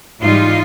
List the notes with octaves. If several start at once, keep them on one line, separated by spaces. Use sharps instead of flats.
G#2 E3 G3 D#4 F4